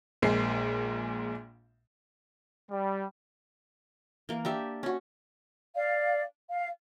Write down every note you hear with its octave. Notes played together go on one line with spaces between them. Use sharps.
A#1 A#2 G#3 C7
G3
E3 A#3
D4 G4 E5
C#4 F#4
D5 F5
F5